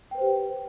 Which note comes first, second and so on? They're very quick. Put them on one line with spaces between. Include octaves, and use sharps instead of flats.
G5 B4 C5 G4